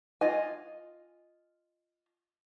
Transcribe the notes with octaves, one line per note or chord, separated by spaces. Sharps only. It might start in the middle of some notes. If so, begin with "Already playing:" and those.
F4 D#5 G#5